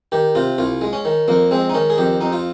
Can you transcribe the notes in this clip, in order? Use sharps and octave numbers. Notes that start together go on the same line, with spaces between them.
D#3 G4
C3 F4
C2 F4
G#3
C#4
D#3
F2 A#3
G#3 C4
D#4
D#3 C#4
G#4
F2 G4
F2 D#4
F4